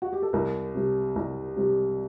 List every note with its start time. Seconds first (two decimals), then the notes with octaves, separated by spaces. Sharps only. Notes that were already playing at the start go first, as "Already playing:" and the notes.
0.02 F#4
0.13 G4
0.22 A4
0.33 C2 A#4
0.74 C3 G3
1.16 C2
1.56 C3 G3